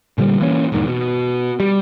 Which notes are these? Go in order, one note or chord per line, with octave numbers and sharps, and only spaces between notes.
A#2 D3 F3 G3
E3 A#3 C#4
E1 E2 G#2 D#3
B2
G3